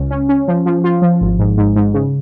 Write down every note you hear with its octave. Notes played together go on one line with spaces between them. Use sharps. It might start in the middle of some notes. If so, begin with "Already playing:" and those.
Already playing: C#2 C#4
C#4
C#4
F3
F3
F4
F3
G#1
G#2
G#2
G#2
C#3